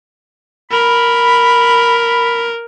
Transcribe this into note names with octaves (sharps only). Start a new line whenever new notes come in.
A#4 B5